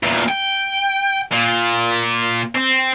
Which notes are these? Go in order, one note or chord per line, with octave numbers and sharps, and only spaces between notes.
E2 A#2
G5
A#2
C4